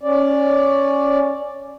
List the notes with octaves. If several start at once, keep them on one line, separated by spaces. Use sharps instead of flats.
C#4 D5